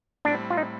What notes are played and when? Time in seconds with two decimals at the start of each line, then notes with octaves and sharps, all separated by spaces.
0.25 A2 G3 C4 D4
0.50 F4
0.57 D#4